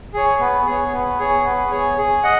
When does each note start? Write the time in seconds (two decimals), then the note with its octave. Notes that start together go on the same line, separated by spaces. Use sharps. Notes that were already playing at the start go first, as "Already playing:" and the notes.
0.14 G#4 C#5
0.40 B3
0.66 G#4 C#5
0.92 B3
1.19 G#4 C#5
1.45 B3
1.71 G#4 C#5
1.97 G#4
2.23 D#5 F#5